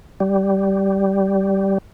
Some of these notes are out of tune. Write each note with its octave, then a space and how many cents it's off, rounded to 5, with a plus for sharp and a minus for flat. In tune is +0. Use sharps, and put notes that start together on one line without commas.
G3 -10